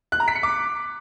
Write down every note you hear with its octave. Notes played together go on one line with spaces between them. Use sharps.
F#6
A#5
B6
C#7
D6